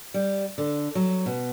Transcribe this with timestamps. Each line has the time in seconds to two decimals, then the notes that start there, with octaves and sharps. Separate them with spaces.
0.14 G3
0.58 D3
0.95 F#3
1.26 B2